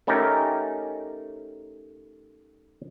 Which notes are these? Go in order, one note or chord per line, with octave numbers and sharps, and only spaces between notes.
A3 C#4 D#4 G4 A#4